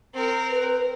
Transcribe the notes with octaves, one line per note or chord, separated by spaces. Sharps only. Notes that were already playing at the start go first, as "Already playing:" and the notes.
C4 A#4
B4